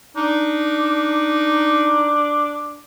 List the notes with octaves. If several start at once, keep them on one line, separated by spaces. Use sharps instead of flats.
D4 D#4